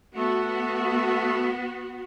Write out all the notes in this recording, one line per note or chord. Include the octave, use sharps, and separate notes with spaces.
A3 B3 F#4